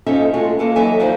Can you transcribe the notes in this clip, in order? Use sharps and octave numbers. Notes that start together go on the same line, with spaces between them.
G#2 F3 C#4 D#4 A4 E5
G#3 A3 F4 F#4
A#3 A4 B4
E3 F#3 D#4 E5 G#5
D2 F3 A#3 D#4 C5